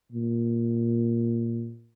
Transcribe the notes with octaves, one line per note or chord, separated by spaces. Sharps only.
A#2